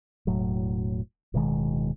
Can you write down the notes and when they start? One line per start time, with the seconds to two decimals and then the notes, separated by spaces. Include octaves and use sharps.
0.27 E1 A2 F#3
1.34 D1 B2 D#3 G#3